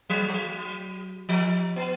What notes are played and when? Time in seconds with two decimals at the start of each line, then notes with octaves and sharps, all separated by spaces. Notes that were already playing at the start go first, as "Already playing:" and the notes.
0.10 F#3
0.28 G3
0.34 F#3
1.29 F3
1.76 B3